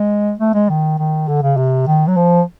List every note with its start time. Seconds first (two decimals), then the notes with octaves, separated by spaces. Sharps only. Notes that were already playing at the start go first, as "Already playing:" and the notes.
Already playing: G#3
0.39 A3
0.54 G#3
0.69 D#3
0.98 D#3
1.28 D3
1.43 C#3
1.57 C3
1.87 D#3
2.08 F#3
2.16 F3